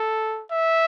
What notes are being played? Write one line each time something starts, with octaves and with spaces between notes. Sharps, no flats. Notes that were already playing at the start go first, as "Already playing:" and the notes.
Already playing: A4
E5